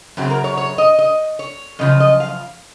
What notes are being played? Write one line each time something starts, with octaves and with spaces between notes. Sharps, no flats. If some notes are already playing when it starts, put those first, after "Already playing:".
F#2 C#3 F#3 C4
A#4
C#5
C#5
D#5
D#5
C#5
F#2 C#3 F3 D#5
D#5
F5